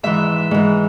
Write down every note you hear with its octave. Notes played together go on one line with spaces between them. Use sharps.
G#2 E3 E5
G#2 E3